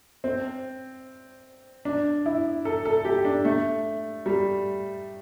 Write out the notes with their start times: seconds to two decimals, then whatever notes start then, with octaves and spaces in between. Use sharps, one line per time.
0.24 C4
1.85 D4
2.26 E4
2.65 A4
2.85 A4
3.05 G4
3.25 D4
3.45 A3
4.26 G3